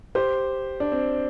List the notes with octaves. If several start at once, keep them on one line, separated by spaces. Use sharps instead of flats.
G4 C5
D4
C4